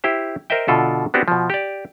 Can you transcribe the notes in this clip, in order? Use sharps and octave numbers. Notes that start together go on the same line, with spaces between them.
E4 G4 C5
A#4 C5 D#5 E5 G5
B2 D3 F4 A4 D5 E5
B3 C4 D4 F#4 G4
B2 F3
G4 D5